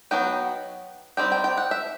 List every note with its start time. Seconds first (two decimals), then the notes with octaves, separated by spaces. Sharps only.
0.11 F#3 B3 D#4 G5
1.17 G3 C4 D#4 G5
1.32 G5
1.44 G5
1.58 F#5
1.71 E5